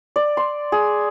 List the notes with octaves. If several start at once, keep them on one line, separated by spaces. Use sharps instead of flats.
D5
C6
G#4